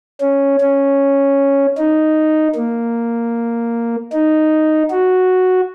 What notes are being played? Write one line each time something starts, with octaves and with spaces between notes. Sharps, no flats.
C#4
C#4
D#4
A#3
D#4
F#4